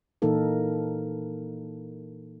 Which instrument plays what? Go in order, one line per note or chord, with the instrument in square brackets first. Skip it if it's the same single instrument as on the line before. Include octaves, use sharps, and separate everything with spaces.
[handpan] A#2 E3 A#3 D#4 A4 A#4